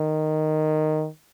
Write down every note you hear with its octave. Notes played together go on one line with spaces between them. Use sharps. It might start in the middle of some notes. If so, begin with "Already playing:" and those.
Already playing: D#3